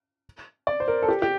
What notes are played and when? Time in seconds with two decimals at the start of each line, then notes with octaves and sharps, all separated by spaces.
0.67 D5
0.80 C5
0.88 A#4
1.02 A4
1.09 G4
1.22 G4